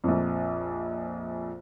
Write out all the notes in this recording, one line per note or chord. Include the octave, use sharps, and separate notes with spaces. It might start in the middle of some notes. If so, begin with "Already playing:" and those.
A#1 F2